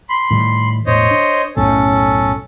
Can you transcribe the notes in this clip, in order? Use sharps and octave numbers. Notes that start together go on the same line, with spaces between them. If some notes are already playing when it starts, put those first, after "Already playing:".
B5 C6
A2 D#3 G3
E1 A2 C5 C#5 D#5
D4
B1 F#2 A2 C#4 A4